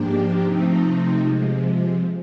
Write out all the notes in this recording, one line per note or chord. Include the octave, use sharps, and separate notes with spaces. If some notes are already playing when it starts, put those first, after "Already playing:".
Already playing: G#2 F3 A#3 D4 G4
C3 F3 A3 C4 D#4
C3 F3 G#3